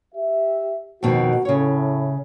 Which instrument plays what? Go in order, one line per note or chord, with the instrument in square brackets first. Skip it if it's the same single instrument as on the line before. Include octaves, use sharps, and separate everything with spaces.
[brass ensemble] G4 E5
[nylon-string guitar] F2 B2 D#3 [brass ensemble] F#4
[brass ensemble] A2 [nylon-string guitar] C#3 C#5